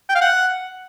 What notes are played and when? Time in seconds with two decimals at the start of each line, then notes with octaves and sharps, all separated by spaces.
0.09 G5
0.15 F5
0.21 F#5